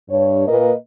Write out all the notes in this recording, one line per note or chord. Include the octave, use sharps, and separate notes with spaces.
G2 C#5
A#2 A#3 B4 D#5